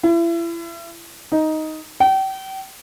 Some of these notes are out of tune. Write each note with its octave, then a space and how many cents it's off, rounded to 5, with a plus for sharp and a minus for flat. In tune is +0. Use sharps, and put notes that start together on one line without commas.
E4 +35
D#4 +5
G5 -35